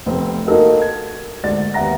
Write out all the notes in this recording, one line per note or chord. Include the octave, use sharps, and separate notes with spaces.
F1 B3 C4
A#3 D#4 F#4 A4 A#4
G#6
D2 G#2 D5 A6
D#2 B3 E5 F#5 A#5 A#6